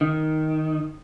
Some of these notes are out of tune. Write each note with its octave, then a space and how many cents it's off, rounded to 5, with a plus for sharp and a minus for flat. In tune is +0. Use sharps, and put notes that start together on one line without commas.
D#3 +5